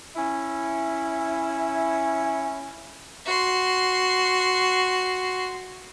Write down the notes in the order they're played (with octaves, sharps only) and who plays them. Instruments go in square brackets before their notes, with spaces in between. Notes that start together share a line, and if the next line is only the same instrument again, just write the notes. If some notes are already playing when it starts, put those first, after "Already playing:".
[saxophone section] C#4 E4
[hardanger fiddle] F#4 C6